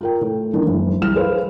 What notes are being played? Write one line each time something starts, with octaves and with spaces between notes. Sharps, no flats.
F4 A#4 G5
A2 A3
D#3 E3 G3 A#3 D4
F#1
C2 E3 F6 E7
G#4 B4 C5 F5